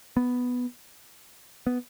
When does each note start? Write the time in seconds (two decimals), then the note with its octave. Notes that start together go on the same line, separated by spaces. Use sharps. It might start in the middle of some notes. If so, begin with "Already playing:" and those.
0.17 B3
1.67 B3